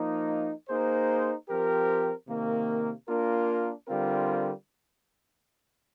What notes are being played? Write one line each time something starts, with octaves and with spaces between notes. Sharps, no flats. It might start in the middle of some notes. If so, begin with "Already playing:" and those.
Already playing: F3 A#3 D#4
A#3 D#4 G#4 C5
F3 C4 G4 A#4
C3 D#3 A#3
A#3 D4 F4 A#4
D3 G3 C4 F4 A#4